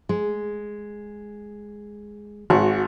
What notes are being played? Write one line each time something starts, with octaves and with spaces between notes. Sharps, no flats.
G#3
G#1 F#4